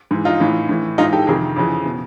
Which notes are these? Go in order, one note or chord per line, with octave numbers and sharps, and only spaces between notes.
G#2 E3
D#4 F4
A2 E3
A2 E3
G#2 E3 D#4 F4
G4 A4
F2 C3 D#3 G#4 A#4
F2 C#3 E3
B2